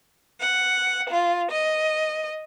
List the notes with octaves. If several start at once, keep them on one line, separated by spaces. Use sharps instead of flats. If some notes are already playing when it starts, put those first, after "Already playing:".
F#5
F4
D#5